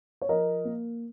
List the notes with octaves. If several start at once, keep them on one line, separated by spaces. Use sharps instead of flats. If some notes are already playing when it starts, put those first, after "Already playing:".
C#5
F3 A#4 D#5
A#3